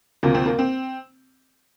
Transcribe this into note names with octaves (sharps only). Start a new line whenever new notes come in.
D2 C3 F3 A#3
C4
A#3
C4